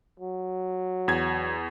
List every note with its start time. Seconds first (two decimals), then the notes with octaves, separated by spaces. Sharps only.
0.20 F#3
1.08 E2 G#6